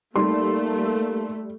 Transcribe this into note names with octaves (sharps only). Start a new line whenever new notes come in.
G3 A3 A#3 D#4 C6